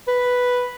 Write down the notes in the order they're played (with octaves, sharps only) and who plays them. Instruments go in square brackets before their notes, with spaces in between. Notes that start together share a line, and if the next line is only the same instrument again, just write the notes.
[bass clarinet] B4